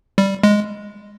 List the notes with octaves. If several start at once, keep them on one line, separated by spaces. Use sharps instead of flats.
G3
G#3